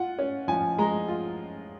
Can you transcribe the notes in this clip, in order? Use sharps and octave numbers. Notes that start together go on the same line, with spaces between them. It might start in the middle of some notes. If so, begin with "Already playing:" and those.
Already playing: F4 F#5
C#4
F3 G#5
G#3 A#5
F4